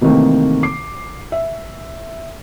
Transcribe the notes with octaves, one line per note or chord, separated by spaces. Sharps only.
C3 D#3 E3 A3 A#3 C4
D6 C7
E5